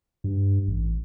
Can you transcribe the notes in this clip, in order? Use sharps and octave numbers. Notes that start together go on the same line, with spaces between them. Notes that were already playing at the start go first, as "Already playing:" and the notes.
G2
A1